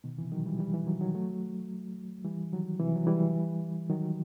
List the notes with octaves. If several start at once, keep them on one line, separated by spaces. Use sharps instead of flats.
B2 D#3
C3 E3
D#3 F#3
E3 G3
E3 G3
E3 G3
D#3 F#3
D#3 F#3
F#3 A3
E3 G3
D#3 F#3
C3 E3
F#3
E3 G3
D#3 F#3